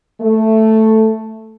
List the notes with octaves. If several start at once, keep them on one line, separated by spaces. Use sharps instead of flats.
A3